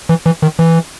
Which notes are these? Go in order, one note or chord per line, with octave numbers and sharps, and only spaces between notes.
E3
E3
D#3
E3